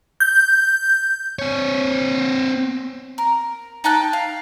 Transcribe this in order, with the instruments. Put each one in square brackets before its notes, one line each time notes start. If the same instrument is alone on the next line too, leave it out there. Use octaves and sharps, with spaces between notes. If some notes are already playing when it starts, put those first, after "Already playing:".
[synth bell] G6
[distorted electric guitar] C4 C#5
[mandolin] A#4
D#4 G5 A5 F#6
F5